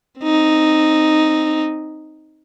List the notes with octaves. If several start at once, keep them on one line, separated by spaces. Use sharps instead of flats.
C4 D#4